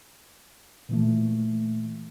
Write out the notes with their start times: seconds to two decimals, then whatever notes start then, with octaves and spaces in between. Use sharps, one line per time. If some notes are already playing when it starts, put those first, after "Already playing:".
0.89 A#2 E3 A3